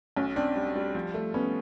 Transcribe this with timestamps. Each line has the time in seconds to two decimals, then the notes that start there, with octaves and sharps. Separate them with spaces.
0.16 B1 C#4
0.36 C4 D4
0.56 G3
0.75 G3
0.95 F3
1.14 A3
1.34 B3 C#4